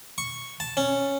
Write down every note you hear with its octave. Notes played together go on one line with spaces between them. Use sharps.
C#6
A5
C#4